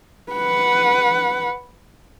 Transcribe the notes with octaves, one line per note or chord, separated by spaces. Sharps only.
B4 F#5